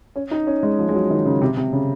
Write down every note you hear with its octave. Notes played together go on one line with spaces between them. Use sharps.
C#4
D#4
C#4
G#3
F3
G#3
F#3
D#3
C#3
C3
C3
C#3